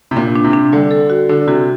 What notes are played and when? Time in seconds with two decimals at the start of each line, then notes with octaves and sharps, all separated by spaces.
0.11 C3
0.16 A#2 D4
0.35 D4
0.44 C3
0.53 D4
0.72 D3 G3
0.91 A4
1.10 F#4
1.29 D3 D4
1.47 C3 F#4